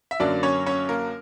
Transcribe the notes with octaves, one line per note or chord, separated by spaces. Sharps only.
E5
F#2 D3 F#3 A#3 D4 D5
C#4 C#5
C#4 C#5
A#3 A#4